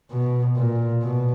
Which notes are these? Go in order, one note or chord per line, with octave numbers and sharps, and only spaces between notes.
B2
A#2
B2